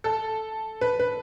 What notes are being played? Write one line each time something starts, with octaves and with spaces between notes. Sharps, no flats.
A4
B4
B4